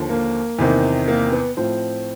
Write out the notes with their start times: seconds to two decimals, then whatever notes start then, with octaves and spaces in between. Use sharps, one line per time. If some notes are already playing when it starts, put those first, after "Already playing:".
Already playing: D#2 D3 F3
0.09 A#3
0.59 E2 C3 D#3
1.08 A#3
1.32 B3
1.57 A2 F3 C4